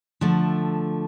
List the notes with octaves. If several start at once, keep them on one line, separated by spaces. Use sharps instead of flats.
D3 F3 A3